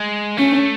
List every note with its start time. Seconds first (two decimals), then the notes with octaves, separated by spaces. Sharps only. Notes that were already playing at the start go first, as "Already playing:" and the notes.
Already playing: G#3
0.37 A3 C#4